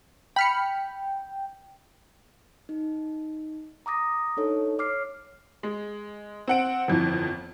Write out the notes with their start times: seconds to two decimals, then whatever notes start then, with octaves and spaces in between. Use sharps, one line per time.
0.36 G5 B5 F6 C#7
2.69 D#4
3.86 A#5 D6 D#6 A#6
4.37 D4 D#4 A4 C#5
4.79 C#5 D6 F6 C7
5.63 G#3
6.48 C4 F#5 D7
6.88 G1 F2 E3